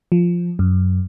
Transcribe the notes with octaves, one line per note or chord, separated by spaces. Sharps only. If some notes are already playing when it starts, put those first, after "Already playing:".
F3
F#2